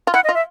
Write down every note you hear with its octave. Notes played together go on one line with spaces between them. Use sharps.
F4
E4 F#5
D#5
F4
E5